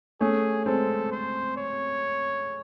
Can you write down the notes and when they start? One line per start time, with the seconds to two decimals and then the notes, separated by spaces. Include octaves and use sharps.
0.20 A3 C#4 G#4
0.66 G#3 C4 A4
1.12 C5
1.57 C#5